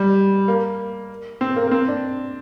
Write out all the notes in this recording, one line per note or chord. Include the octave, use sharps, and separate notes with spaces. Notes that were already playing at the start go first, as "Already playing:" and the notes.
Already playing: G3
A#3
C4
A#3
A#3
C4
D4